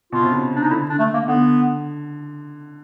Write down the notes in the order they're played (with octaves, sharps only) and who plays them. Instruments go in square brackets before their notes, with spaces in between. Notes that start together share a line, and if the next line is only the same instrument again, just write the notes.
[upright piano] B2 [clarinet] F4
[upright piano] C3
C#3
[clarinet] D4
D#4
[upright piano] D3 [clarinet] E4
[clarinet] D4
A3
A#3
[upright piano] D3 [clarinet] B3